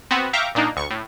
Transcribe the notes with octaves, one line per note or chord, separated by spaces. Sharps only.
B3 C4 F#4
E5 F5 G5 A#5 C#6 D6
A#2 A#3 D4 D#4
D2 C#6
A2